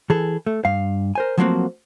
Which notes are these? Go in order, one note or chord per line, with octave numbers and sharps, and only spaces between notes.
E3 G#4 A4
A3
G2 F5
A#4 C5 G#5
F3 F#3 A3 A#3 C4 F#4